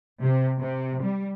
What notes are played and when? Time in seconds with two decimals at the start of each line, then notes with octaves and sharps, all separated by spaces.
0.21 C3
0.59 C3
1.02 G3